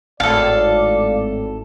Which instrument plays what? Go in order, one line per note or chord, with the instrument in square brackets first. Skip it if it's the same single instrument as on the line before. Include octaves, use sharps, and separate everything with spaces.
[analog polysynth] G#1 A2 [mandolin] A4 A5 [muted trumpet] D5 [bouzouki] F5